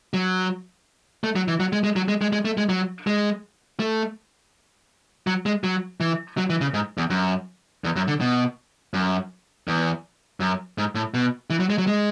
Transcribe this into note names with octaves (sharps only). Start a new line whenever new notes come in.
F#3
A3
F#3
E3
F#3
G#3
G#3
F#3
G#3
G#3
G#3
A3
G#3
F#3
G#3
A3
F#3
G#3
F#3
E3
F#3
E3
C#3
G#2
E2
F#2
E2
F#2
D3
B2
F#2
E2
F#2
G#2
A2
B2
E3
F#3
G#3
F#3
G#3